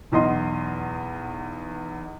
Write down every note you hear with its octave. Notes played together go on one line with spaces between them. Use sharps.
B1 E2 D#5 C6